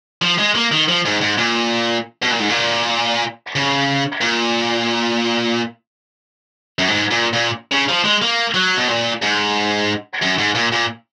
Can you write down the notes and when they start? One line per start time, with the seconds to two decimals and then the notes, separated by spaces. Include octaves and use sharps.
0.22 F3
0.39 G#3
0.55 A#3
0.72 D#3
0.89 F3
1.06 G#2
1.21 G#2
1.38 A#2
2.22 B2
2.31 A#2
2.40 G#2
2.49 A#2
3.56 C#3
4.21 A#2
6.79 F#2
6.88 G#2
7.11 A#2
7.33 A#2
7.72 C#3
7.89 F3
8.05 G#3
8.22 A#3
8.54 F#3
8.77 B2
8.88 A#2
9.22 G#2
10.22 F#2
10.38 G#2
10.55 A#2
10.72 A#2